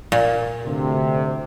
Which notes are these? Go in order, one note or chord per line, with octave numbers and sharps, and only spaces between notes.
A#2
D2 C3